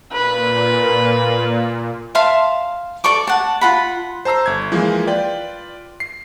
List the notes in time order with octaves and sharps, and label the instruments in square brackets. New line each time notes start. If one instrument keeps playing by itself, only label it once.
[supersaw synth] A#2 [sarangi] B4
[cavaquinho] E5 F5 A5 C6
A4 D5 C#6 D6
F#5 A5
F4 F#5 B5
[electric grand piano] C5 A5 A#5 E6 C7
G1 G#6
E3 F3 G#3 A#3
F4 B4 D5 G5
C7